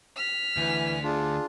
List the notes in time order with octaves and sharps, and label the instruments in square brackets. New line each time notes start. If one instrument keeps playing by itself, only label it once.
[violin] F6 B6
[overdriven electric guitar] D2 [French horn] E3 [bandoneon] G#5
[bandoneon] D4 F4 [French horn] G#4